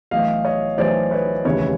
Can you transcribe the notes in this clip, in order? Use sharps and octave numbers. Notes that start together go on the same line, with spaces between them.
B1 A2 E3 D#5 F5
C#5 D#5
B1 A2 E3 C5 D5
B4 C#5
F1 D#2 C#3 E3 B4 C#5